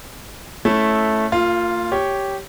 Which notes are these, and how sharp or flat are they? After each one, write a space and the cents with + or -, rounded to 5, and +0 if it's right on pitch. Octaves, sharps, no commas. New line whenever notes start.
A3 -10 C#4 -10 E4 -10
A#3 -35 F4 +0
G4 -5 C#5 +0